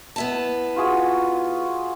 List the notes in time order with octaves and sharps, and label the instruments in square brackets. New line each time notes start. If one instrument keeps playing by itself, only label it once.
[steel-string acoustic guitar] B3 E4 A5
[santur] F4 F#4 G#4